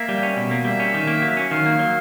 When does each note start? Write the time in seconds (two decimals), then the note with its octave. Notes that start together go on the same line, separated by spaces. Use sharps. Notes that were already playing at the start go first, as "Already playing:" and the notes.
Already playing: A#3 E5
0.09 G3
0.23 C#4
0.36 B2 E5
0.51 A#3
0.65 G3 E5
0.80 C#4
0.94 D#3
1.07 A#3
1.22 F#3
1.37 C#4
1.51 D#3 F5
1.66 A#3
1.79 F#3